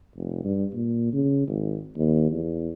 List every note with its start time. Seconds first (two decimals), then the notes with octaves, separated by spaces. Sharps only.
0.16 F1
0.44 G2
0.74 A#2
1.13 C#3
1.48 G#1
1.97 D#2
2.31 E2